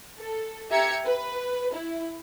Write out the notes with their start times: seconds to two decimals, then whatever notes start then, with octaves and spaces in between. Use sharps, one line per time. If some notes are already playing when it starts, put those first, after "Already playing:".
0.19 A4
0.70 G4 E5 A#5 G#6 C#7
1.05 B4
1.74 E4